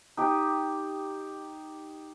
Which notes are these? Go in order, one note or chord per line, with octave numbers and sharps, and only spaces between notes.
D#4 G4